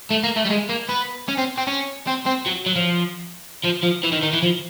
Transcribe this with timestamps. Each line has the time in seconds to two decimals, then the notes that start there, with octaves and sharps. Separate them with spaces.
0.10 A3
0.24 A#3
0.36 A3
0.45 G3
0.50 G#3
0.70 A#3
0.89 B3
1.29 C#4
1.38 C4
1.58 C4
1.67 C#4
2.07 C4
2.26 C4
2.46 F#3
2.66 F#3
2.76 F3
3.64 F3
3.83 F3
4.04 E3
4.12 D#3
4.23 D#3
4.33 E3
4.43 F3